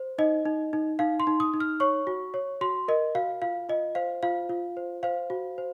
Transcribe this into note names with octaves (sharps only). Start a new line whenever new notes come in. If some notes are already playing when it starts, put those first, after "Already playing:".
Already playing: C5
D#4 D#5
D#4
D#4
D#4 F5
C6
D#4
D#6
D#4
F6
C#5 C#6
F#4
C#5
F#4 C6
A#4 D#5
F#4 F5
F4 F5
F4 D#5
C5 F5
F4 F5
F4
C5
C5 F5
F#4
C5